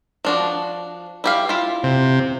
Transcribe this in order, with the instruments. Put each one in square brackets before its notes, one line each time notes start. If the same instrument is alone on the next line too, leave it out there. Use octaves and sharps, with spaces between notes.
[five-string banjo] F3 D4 F#4
E4 G4 F5
E4 F4
[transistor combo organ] C3